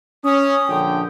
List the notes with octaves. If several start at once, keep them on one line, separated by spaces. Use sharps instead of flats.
C#4 D#6
A#1 D3 G5